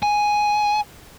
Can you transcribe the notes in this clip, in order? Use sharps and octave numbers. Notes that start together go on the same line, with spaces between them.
G#5